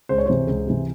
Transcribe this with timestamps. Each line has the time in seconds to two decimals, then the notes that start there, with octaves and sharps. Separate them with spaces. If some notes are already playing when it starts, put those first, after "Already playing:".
0.09 C#2 C5
0.18 C#5
0.26 C3 E3 C5
0.47 C#2
0.67 C3 E3